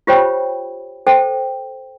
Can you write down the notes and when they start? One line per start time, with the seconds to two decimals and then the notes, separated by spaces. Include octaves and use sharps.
0.07 F4 G4 C5 C#5 G5 B5
1.07 A4 C5 G5 A5